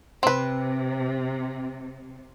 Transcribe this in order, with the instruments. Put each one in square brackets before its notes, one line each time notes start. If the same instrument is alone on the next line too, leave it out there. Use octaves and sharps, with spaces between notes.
[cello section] C3 [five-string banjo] C4 B4